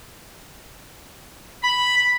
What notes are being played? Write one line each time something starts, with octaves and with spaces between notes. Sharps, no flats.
B5